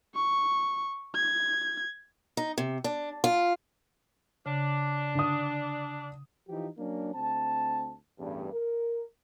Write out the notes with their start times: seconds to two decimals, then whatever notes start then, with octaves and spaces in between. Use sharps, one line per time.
0.15 C#6
1.15 G#6
2.37 D#4
2.58 C3
2.84 D4
3.24 F4
4.46 C#3 D4
5.15 D3 D#6
6.49 E3 F3 D#4 F4 G4
6.78 F#3 A#3 C#4 D4
7.13 D2 C4 A5
8.19 A1 E2 G2
8.53 A#4